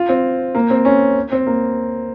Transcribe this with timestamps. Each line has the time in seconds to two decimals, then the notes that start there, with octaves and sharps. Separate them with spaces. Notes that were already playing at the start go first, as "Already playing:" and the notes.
Already playing: F4
0.09 C4
0.55 A#3
0.70 C4
0.85 C#4
1.32 C4
1.47 A#3